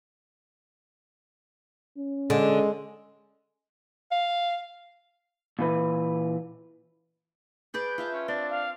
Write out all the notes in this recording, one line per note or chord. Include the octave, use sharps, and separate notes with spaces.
C#4
D3 G#3
F5
A#2 E3 B4
G#4 B4 D5 G6
F4 E5 A5
C#4
C4 D4 A6
F5